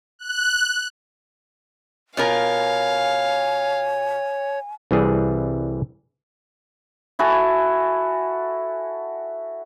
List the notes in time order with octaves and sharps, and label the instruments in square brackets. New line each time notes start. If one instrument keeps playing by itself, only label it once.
[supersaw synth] F#6
[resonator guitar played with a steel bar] B2 F4 A#4 [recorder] C#5 [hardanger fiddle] F5 [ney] G#5
[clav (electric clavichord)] C2 E3 G3 G#4
[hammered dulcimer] E4 F#4 A4 G#5